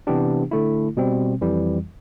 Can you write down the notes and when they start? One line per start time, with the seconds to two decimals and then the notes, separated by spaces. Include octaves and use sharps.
0.07 C3 E3 B3 D4 G4
0.51 D3 A3 E4
0.97 B2 G3 C4
1.41 F2 E3 G3